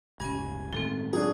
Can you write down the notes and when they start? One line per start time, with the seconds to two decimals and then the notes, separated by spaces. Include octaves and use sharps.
0.20 D1 G1 C#2 G2 C#4 G#5
0.73 A2 D#3 G#3 C4 A4 A6 G7
1.13 F#3 D4 G#4